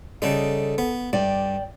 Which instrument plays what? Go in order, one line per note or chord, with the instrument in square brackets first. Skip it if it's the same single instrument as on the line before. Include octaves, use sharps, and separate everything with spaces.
[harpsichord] C#3 G3 D#4 [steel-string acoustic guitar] A4
[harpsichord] B3
[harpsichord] G2 [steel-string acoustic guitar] D5 G5